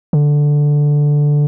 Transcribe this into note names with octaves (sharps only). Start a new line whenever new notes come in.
D3